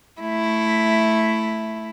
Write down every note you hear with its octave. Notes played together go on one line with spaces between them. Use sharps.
A3 E4